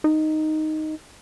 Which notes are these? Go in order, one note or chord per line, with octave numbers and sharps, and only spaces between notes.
D#4